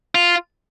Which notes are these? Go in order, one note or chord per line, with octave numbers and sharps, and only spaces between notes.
F4